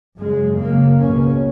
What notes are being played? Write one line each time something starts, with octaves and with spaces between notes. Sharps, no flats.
F#2 C#3 G#3
F#2 C#3 A#3
C#2 B2 C#4